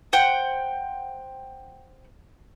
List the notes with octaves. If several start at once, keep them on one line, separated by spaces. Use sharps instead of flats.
C5 F#5 G5